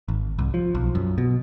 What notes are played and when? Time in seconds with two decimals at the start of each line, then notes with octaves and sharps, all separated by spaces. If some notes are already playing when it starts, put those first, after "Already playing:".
0.08 G#1
0.39 C2
0.54 F3
0.75 B1
0.95 F#2
1.18 B2